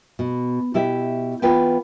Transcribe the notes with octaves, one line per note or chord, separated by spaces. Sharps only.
B2
B2 E4 G4 E5
E3 B3 F4 B4 G5 G#5